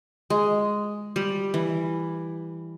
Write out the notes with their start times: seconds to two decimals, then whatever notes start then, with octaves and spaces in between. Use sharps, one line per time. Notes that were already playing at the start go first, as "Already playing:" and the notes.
0.30 G#3
1.16 G3
1.54 E3